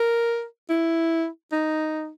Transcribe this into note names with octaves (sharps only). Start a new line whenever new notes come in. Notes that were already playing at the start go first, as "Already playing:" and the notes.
Already playing: A#4
E4
D#4